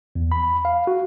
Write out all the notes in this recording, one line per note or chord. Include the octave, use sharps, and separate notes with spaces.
E2
B5
F5
F#4